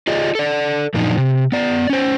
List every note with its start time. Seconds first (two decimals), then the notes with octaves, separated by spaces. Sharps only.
0.07 F4 G#4 D5 D#5
0.35 A4 D5
0.94 F#2 A#2 F3 D4 D#4
1.17 C3
1.52 B3 D5
1.90 C#4 C5